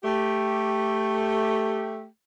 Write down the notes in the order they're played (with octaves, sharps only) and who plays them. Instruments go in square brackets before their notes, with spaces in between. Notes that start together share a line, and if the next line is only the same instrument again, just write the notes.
[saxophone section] A3 G4